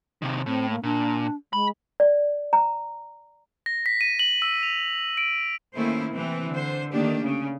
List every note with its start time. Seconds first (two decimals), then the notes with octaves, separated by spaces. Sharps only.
0.22 C3 D#3
0.46 A2 C4
0.71 A#3
0.83 A#2 D4
1.53 G#3 B5
2.00 D5
2.53 A#5
3.66 A#6
3.86 B6
4.01 D#7
4.19 F#7
4.42 E6
4.63 F7
5.17 D7
5.75 D#3 A3 A#3 C#4 E4 C5
6.11 C3 E3 C4
6.49 D3 C5
6.91 D#3 A3 A#3 D4 G4
7.23 C#3